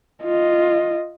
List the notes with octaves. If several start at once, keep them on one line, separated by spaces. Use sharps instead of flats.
F4 D#5